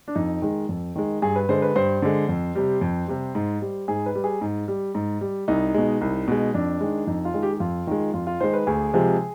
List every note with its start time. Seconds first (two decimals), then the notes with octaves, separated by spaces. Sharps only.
0.08 D4
0.15 F2 D#4
0.42 D#3 G#3
0.69 F2
0.96 D#3 G#3
1.22 G2 G#4
1.36 B4
1.49 D3 G#3 C5
1.62 B4
1.75 G2 C5
2.02 D3 G#3
2.29 F2
2.55 C3 G3
2.81 F2
3.08 C3 G3
3.35 G#2
3.62 G3
3.88 G#2 G#4
4.06 B4
4.15 G3
4.24 G#4
4.41 G#2
4.68 G3
4.95 G#2
5.21 G3
5.48 C2 D#4
5.74 B2 G#3
6.01 C2
6.28 B2 G#3
6.54 F2 D4
6.81 D#3 G#3
7.07 F2 D#4
7.25 F4
7.34 D#3 G#3
7.43 G4
7.54 G4
7.60 F2 F4
7.87 D#3 G#3
8.14 F2 F4
8.27 F4
8.40 D#3 G#3 C5
8.53 B4
8.67 D2 G#4
8.94 C3 F3 G#3